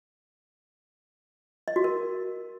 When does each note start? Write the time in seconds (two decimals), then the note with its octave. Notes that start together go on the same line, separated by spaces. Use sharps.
1.68 D#5
1.76 F#4
1.84 A#4